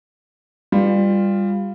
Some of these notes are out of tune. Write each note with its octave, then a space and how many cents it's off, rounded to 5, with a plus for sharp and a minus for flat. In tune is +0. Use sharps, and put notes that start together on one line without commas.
G3 +20 F4 +0 B4 +0